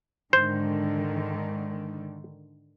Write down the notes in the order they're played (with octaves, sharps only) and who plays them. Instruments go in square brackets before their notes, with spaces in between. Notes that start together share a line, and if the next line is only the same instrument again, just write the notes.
[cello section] G#2 D3 D#3 [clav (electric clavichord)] C5